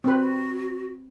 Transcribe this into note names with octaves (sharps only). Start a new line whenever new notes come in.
C4 F#4 B4